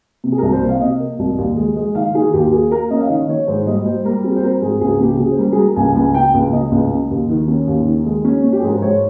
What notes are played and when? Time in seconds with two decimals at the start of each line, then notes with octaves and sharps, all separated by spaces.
0.24 C3
0.32 G#4
0.38 C2 A#4
0.52 C5
0.62 C3
0.69 F5
0.81 C3 D#5
1.00 A#3
1.19 C2
1.38 D#2
1.57 G#3
1.76 G#3
1.95 D#3 F5
2.14 D#3 G#4
2.33 D#2 G4
2.47 G4
2.52 A#3 G#4
2.71 A#3 A#4
2.91 C#4 D#5
3.01 F5
3.10 D#3 D#5
3.29 D#3 C#5
3.48 G#2 C5
3.67 G3 D#5
3.86 G3 C5
4.05 G3 A#4
4.24 C4 G#4
4.36 C5
4.43 C4 A#4
4.62 G#2 G#4
4.81 C#2 G#4
5.00 C#3 G4
5.19 C#3 G#4
5.31 C5
5.39 G3 A#4
5.53 G#4
5.57 G3 A#4
5.76 C#2 G#5
5.95 C#2 G#5
6.14 C#3 G5
6.34 C#2
6.53 C#3 D#5
6.71 C#2
6.91 C#3
7.11 D#2
7.30 D#3
7.48 C#4
7.67 D#2
7.87 D#3
8.06 G#3
8.25 C#4
8.44 C#4
8.53 G4
8.60 G#4
8.63 G#2 A#4
8.75 C5
8.81 G#2 C#5